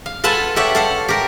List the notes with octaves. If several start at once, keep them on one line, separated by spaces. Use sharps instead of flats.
F5
F4 A4 B4 F#5 G#5 A5
G4 A4 C#5 E5 F#5
A4 F5 F#5
G4 A#4